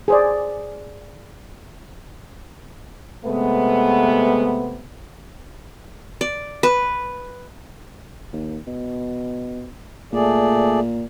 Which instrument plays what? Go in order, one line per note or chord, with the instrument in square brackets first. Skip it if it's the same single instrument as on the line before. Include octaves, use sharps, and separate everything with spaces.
[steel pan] G#4 C5 D5
[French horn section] C3 G#3 A3 B3
[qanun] D5
B4
[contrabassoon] D#2
B2
[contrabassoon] A#2 [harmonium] A3 G#4 D5